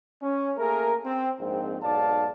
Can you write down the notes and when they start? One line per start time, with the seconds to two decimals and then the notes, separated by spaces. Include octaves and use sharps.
0.21 C#4
0.57 A3 A#3 G#4 A#4
1.04 C4
1.39 A#1 G#2 C4
1.82 B1 G#2 D5 F5 A5